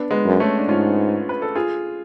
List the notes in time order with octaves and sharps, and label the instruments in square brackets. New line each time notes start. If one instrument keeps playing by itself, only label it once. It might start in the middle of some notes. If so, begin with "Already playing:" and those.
Already playing: [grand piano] B3 D4
G#3 B3
[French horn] F#2
[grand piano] A3 C#4
D4
[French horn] G#2 [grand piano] C#4 F4
[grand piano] B4
A4
F4 G#4